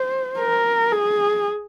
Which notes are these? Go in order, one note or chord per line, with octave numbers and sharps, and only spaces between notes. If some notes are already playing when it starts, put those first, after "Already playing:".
Already playing: C5
A#4
G#4